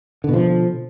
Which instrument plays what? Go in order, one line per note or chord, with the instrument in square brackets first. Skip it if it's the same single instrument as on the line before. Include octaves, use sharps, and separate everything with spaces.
[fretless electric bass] D3
B2
F3